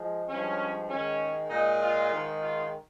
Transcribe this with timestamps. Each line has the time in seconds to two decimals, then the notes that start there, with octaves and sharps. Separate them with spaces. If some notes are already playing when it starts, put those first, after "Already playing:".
Already playing: F3 G#3
0.29 G2 F3 G#3 C#4
0.89 G#2 D#3 G#3 C#4
1.49 A#2 G#3 D#4
1.80 F4
2.10 G#2 D#3 G#3
2.40 F4